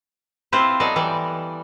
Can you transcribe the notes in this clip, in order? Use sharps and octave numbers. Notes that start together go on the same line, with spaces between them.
C4 E4 F4 G4 B4 C5
F#3 B3 A4 D5 D#5
E3 G3 D5